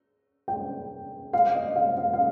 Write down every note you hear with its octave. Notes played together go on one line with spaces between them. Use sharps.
G5
F5
D#5
F5
F5
F5